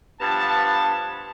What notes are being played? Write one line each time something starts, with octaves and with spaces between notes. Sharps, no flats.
G2 F3 B3 A5